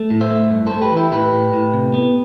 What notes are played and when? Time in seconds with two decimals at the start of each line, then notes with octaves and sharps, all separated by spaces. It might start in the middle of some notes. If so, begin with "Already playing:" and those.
Already playing: A3
0.11 A2
0.21 C5 E5
0.31 A3
0.51 G2
0.67 A3 A4 C5
0.81 G4 B4
0.92 E3
0.97 E4 G4
1.12 A2 G4 B4
1.33 A2
1.53 A2
1.73 C3
1.94 B3